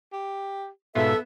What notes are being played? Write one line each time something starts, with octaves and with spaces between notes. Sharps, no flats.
G4
G#2 B2 B3 F4 A4 E5